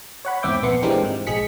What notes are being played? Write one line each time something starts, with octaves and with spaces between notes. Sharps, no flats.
C#5 F#5 B5
E2 G#2 C4 E5 D6 G6
A#1 B3 C6 C#7
E3 G#3 C4 D4 G4 A#4
G#2 G#3
A#1 G#3 G#4 B6 C#7